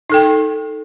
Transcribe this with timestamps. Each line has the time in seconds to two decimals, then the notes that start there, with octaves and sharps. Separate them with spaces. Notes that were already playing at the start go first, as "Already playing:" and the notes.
0.10 D#4 A4 G5